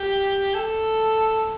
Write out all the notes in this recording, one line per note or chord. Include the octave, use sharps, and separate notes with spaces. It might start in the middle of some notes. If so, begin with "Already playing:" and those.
Already playing: G4
A4